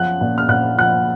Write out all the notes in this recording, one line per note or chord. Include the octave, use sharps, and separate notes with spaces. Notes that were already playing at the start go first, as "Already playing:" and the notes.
Already playing: F#2 F3 F#5 F#6
A#2
F6
A#2 F#5 F#6
F3 F#5 F#6